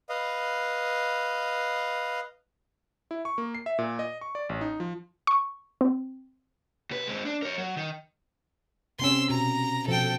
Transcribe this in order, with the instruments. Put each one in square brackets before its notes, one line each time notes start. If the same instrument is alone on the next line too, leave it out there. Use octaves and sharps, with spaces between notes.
[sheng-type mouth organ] B4 D#5 F5
[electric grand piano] E4
C#6
A#3
C7
E5
A#2
D#5
C#6
D5
A1
D#4
F3
[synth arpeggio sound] C#6
C4
[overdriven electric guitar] C2 B4
G#3 C4
D4
A#4 C#5
F#3
D#3
[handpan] C3 C4 C#4 [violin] C6 E6
[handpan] B2 [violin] A#5
[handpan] B2 F3 [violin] A4 G5